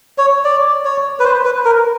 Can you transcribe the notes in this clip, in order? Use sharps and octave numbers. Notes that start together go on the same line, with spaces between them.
C#5
D5
C#5
B4
C5
B4
A#4